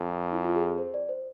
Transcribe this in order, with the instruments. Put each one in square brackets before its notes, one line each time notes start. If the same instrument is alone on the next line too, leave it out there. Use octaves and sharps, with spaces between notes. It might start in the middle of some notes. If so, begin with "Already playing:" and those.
Already playing: [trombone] F2
[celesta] E4
F4
G#4
C5
D5
C5